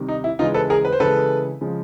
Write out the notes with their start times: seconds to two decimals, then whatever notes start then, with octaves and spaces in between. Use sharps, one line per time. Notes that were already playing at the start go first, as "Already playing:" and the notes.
Already playing: C3 D#3 G3
0.08 D#4
0.24 E4
0.39 C#3 E3 G#3 D#4 F4
0.54 A4 B4
0.70 G#4 A#4
0.85 B4
0.92 C5
1.00 C#3 E3 G#3 A4 B4
1.61 C#3 F3 G#3